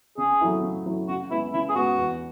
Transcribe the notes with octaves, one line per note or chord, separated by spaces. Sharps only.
C#3 G#4
F#3 A3 E4
C#3
F#3 A3 E4
C#3 F#4
G#3 B3 E4
C#3 E4
G#4
G#3 B3 F#4
E2